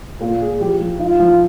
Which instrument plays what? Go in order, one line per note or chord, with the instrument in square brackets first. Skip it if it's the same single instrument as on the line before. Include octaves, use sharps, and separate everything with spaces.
[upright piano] A#2 [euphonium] F4
[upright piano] G#4
[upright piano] F3 [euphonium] G4
[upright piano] F3
[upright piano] D#4 [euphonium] F4
[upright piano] F3